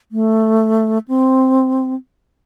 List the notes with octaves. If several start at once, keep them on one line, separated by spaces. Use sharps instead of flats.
A3
C4